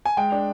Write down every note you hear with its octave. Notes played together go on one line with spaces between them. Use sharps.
G#5
G#3 G5
D4